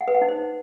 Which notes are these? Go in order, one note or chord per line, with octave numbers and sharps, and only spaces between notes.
F#5
B4
F#5
D#4
C5